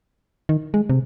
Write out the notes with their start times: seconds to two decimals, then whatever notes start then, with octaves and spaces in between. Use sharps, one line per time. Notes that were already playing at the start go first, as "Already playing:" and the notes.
0.49 D#3
0.74 G#3
0.90 C3